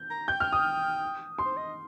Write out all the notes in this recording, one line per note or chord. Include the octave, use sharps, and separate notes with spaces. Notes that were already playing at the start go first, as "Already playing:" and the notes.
Already playing: G6
A#5
G5 G6
F6
D#6
C6
C5
D#5